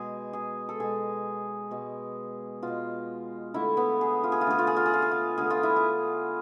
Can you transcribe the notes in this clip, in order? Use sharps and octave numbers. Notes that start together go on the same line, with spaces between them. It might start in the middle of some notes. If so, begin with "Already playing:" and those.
Already playing: B2 G#3 G#4
G#4
A4
B2 G#3 G#4
B2 G#3
B2 G#3 F4
D3 A3 E4
B3
G#4
F4
G#4
F4
D3 A3 G#4
F4
G#4
F4
G#4
F4
G#4
F4
D3 A3 G#4
F4
E4
F4